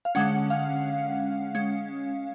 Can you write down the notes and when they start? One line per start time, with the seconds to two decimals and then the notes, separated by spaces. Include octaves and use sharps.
0.05 F5
0.15 D3 G#3 C#4 F#5
0.50 F5
1.55 G#3 C#4